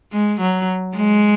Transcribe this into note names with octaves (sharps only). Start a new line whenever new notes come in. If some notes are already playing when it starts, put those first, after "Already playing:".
G#3
F#3
G#3